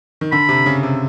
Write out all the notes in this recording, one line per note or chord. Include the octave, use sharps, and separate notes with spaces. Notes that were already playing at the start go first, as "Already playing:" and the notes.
D#3
D3 B5
C3
C#3
C3